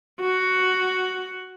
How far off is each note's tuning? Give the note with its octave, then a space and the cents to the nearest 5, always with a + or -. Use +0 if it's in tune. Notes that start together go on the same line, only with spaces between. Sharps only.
F#4 +5